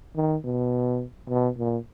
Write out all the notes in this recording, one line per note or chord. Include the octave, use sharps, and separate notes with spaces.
D#3
B2
B2
A#2